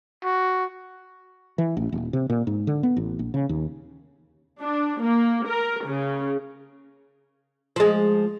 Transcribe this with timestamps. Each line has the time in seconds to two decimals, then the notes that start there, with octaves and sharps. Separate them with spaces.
0.24 F#4
1.58 E3
1.77 A1
1.92 D#1
2.13 C3
2.30 A#2
2.47 G#2
2.67 D3
2.83 B3
2.97 A1
3.19 A#1
3.34 C#3
3.49 D#2
4.61 D4
5.02 A#3
5.47 A#4
5.85 C#3
7.76 F3 G#3